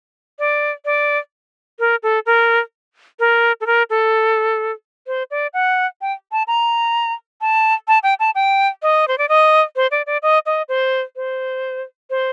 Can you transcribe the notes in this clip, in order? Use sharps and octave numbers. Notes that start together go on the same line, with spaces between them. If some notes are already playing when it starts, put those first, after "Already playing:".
D5
D5
A#4
A4
A#4
A#4
A4
A#4
A4
C5
D5
F#5
G5
A5
A#5
A5
A5
G5
A5
G5
D#5
C5
D5
D#5
C5
D5
D5
D#5
D#5
C5
C5
C5